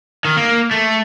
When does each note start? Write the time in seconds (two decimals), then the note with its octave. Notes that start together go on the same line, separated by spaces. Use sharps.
0.25 D#3
0.37 A#3
0.71 A3